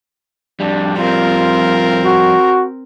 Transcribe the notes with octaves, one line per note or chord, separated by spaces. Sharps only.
F2 G3 D4
C4 F4 A#4
F#4